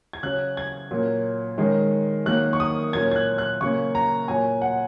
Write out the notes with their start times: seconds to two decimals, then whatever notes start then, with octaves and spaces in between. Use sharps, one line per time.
0.13 G#6
0.23 C#3 F#3 C#4 F#6
0.57 G#6
0.91 A#2 F#3 C#4
1.58 D#3 G#3 C#4
2.26 D#3 F#3 A#3 F#6
2.53 C#6
2.60 D#6
2.93 A#2 F#3 C#4 G#6
3.11 G#6
3.16 F#6
3.38 F#6
3.61 C#3 F#3 A#3 C#6
3.95 A#5
4.28 A#2 F#3 C#4 G#5
4.62 F#5